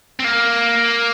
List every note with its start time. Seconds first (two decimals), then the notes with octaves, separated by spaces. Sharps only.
0.20 C4
0.24 A#3